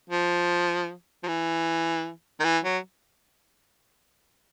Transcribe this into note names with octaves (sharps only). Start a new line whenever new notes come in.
F3
F3
E3
D#3
E3
F#3